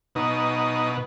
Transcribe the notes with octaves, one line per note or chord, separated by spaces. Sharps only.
B2 D#4